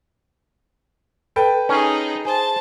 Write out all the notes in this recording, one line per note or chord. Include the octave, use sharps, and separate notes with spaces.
A4 B4 G5
C#4 D#4 G#4
G#4 C5 A5